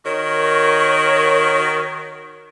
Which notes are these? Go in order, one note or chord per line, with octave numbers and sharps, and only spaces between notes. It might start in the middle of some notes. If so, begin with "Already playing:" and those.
D#3 F#4 A#4 C#5